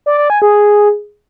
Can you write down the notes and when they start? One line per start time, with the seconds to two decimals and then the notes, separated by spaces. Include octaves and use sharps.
0.06 D5
0.18 D5
0.30 G#5
0.42 G#4